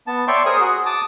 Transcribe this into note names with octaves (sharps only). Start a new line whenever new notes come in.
B3 A5
C#5 D5 E5 G5 C6 C#6
G#4 A#4 C5 G#5 D#6
F#4 G#4 F#5
A5 D6 D#6